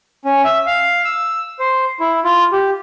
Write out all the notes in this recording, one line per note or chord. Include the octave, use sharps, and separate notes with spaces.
C#4
E5
F5
E6
C5
E4
F4
G4